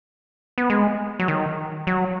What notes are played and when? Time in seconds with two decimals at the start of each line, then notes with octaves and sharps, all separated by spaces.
0.58 B3
0.70 G#3
1.20 F#3
1.28 D#3
1.87 F#3